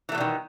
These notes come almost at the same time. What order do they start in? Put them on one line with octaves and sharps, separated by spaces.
E3 A3 B2 G3 D#3